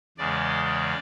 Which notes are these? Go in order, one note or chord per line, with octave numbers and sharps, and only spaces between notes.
E2 C#3 G#3 D5
D5